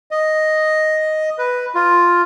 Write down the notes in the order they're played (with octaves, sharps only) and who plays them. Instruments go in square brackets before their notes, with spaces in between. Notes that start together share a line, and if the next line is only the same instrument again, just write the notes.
[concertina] D#5
B4
F4